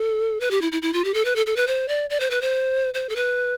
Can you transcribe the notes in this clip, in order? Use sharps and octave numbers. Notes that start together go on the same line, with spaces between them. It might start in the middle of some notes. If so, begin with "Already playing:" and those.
Already playing: A4
B4
G4
E4
E4
E4
F4
G4
A4
B4
A4
A4
B4
C5
D5
D5
C5
B4
C5
C5
A4
B4